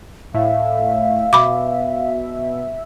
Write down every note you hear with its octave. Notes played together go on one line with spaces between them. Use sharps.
A2 E5 F5
B2 B5 D6